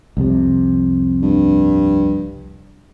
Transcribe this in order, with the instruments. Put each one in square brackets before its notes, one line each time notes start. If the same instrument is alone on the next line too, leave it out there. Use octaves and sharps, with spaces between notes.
[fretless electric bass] C2 F2 C3
[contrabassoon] G2